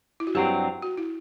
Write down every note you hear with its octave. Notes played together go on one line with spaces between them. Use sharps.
E4
F#4
G2 F#3 C4 G4
F#4
E4